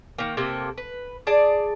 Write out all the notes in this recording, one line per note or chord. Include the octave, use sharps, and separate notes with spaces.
D#3 A#3
C3 A#3 A4
B4
G#4 D5 A5